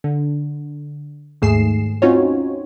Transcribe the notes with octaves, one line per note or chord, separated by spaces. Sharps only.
D3
D#2 G#2 A3 G#4 C7 E7
C4 C#4 D#4 F4 F#4 C#5